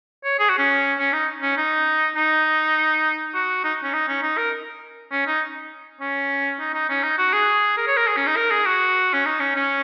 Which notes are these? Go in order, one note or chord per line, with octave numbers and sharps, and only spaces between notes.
C#5
G#4
F#4
C#4
C#4
D#4
C#4
D#4
D#4
F#4
D#4
C#4
D#4
C#4
D#4
A#4
C#4
D#4
C#4
D#4
D#4
C#4
D#4
F#4
G#4
A#4
C#5
A#4
G#4
C#4
D#4
A#4
G#4
F#4
C#4
D#4
C#4
C#4